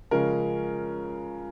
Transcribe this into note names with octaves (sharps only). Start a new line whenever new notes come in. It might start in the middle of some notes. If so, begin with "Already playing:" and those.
C#3 F3 G#3 C#4 A#4